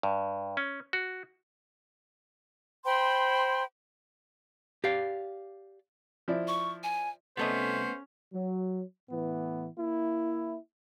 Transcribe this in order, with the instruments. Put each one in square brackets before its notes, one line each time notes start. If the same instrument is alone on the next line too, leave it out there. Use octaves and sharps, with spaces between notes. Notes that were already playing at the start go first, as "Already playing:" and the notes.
[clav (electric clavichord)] G2
C#4
F#4
[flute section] C5 G5 B5 C6
[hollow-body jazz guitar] G4 D5 F5
[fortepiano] F3 E4 D5
[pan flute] C#6
G#5
[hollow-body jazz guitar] C2 A4 D#5 [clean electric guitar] A3 B3 [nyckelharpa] C#4 [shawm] C5
[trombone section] F#3
A2 E3 B3
A#3 E4